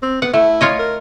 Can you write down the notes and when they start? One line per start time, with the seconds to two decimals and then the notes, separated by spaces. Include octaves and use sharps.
0.02 C4
0.22 B3 F#5
0.34 A3 E4
0.61 F4 C#5 D#5
0.79 A#4